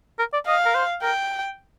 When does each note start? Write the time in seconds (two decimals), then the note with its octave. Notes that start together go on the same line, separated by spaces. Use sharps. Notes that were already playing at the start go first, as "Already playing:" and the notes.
0.19 A#4
0.33 D5
0.47 D#5 F5
0.66 A#4
0.75 C5
1.03 A#4 G5